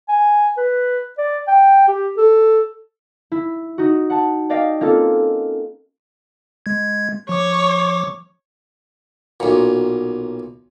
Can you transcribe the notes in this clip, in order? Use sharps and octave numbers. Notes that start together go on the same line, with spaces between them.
G#5
B4
D5
G5
G4
A4
E4
D#4 F#4
F#5 A5
D5 D#5 F5 G5
A#3 C4 C#4 F4 A4
G#3 G#6
F3 C#5 D6
B1 A#2